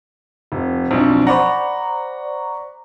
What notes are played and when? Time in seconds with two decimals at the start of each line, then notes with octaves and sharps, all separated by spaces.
0.52 F1
0.91 B1 F2 D4
1.27 C5 D5 F#5 A#5 B5 C#6